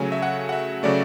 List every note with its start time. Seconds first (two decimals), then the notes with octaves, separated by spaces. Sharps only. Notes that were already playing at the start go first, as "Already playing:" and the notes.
Already playing: C#3 F#3 A3 G#5
0.12 E5
0.22 F#5
0.49 F#5
0.52 E5
0.83 C#3 F#3 A3 D5